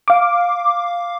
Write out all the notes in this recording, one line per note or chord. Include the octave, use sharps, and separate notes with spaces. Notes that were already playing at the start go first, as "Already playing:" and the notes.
F5 D6